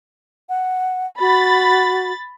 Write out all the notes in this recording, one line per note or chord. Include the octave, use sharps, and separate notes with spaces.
F#5
F#4 B5 A6